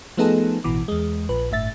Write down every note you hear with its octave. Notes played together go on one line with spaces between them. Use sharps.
F3 A3 B3 D#4 G#4 A4
A1 B2 E3 D6
E2 G#3
A#1 B4
G1 A2 E5 A6